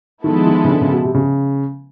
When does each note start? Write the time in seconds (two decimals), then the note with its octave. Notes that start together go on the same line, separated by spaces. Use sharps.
0.24 D#3 F3 G#3 B3 E4 A4
0.47 D#3
0.64 C#3
0.70 D3
0.81 C#3
0.92 B2
1.04 C3
1.15 C#3